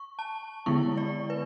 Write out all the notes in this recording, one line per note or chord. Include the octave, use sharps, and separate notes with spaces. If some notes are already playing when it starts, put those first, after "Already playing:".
Already playing: C#6
A5
D3 G#3 B3 E4 C#6
D5
B4